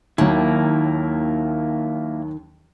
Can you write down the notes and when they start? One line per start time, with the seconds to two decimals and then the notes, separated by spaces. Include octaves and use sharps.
0.18 D#2 D#3 F#3 A#3 E4